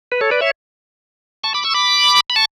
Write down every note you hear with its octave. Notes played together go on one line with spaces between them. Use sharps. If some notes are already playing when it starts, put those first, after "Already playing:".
B4
A4 C#5
B4 D5
C#5 E5
A5 C#6
B5 D6
C#6 E6
B5 D6
B5
A5 C#6